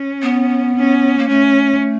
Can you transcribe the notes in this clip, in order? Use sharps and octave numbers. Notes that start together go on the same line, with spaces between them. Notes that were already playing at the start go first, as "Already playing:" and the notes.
Already playing: C#4
B3
C#4
A#3
A3 C#4